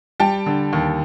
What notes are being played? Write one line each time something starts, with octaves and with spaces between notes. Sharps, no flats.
G3 G5 A5
D3
D#2